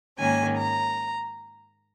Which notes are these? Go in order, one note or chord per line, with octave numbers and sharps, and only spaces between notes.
G#2 D#3 A#3 C#4 G#5
A#5